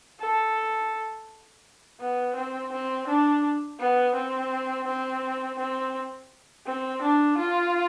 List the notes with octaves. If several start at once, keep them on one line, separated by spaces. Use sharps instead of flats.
A4
B3
C4
C4
D4
B3
C4
C4
C4
C4
D4
F4